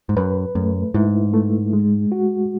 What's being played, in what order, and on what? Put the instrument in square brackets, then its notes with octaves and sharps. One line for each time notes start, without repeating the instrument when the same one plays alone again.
[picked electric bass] G#2
[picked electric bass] F#2 [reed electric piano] B4
[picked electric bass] F#2 [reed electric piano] A3
[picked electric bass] G#2 [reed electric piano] E4
[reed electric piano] A3
G#3
F#4